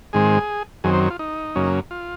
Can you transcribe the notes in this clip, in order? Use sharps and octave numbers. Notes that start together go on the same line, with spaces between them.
G#2 D#3 G#3 C4 G#4
F#2 D#3 F#3 C4 G#4
C5
C#5
F4
D#4
F#2 C#3 F#3 A#3 C#4
F4